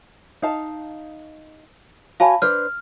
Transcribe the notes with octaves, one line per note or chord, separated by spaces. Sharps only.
D#4 F5 A5
F#4 C#5 F5 G#5 A5 B5
D4 B4 C5 F6